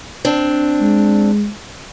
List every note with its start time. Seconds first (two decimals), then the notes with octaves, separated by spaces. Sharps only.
0.25 C4 D4
0.81 G#3